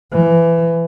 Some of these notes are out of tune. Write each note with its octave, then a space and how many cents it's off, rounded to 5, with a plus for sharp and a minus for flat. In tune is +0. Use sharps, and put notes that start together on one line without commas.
E3 +20